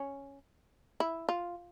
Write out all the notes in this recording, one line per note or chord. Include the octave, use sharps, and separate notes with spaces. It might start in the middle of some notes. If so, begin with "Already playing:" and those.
Already playing: C#4
E4
F4